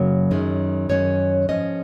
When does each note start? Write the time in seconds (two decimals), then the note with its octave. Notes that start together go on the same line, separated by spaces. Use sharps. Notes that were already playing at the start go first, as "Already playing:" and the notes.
Already playing: F#2 C#3 F#3 A#3
0.31 F#2 D#3 G#3 C#4
0.89 F#2 D#3 G#3 C#4 C#5
1.49 G#2 F3 G#3 C#4 D#5